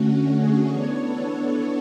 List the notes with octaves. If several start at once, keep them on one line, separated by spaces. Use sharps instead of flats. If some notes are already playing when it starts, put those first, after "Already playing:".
Already playing: D3 A3 C#4 F#4
G#4
E3 B3 D4 C#5
A4
A4